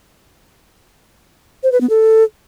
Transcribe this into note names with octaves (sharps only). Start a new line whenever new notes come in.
C5
B4
B3
A4